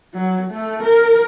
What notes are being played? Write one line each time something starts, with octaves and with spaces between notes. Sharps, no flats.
F#3
A3
A#4